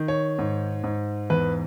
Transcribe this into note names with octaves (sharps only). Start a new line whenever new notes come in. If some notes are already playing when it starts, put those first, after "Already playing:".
Already playing: D#3
C#5
G#2
G#2
E2 B4